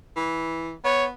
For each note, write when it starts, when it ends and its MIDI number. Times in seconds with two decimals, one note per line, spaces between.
0.16 0.73 52
0.84 1.11 59
0.84 1.06 73